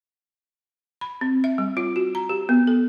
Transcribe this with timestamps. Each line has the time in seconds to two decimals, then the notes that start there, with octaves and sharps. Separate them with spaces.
1.01 B5
1.21 C4
1.44 E5
1.58 G3
1.77 F4
1.96 F#4
2.15 A#5
2.29 G4
2.49 B3
2.67 A4